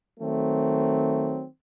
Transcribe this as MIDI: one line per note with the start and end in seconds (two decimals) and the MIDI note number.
0.20 1.45 51
0.20 1.45 54
0.20 1.45 57
0.20 1.45 60